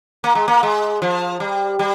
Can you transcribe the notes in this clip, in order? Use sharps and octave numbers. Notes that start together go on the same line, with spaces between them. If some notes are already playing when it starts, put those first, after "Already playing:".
A#3
G#3
A#3
G#3
F3
G3
G3